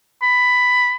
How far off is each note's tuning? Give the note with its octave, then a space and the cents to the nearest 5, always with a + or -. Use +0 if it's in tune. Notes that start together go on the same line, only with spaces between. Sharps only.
B5 +10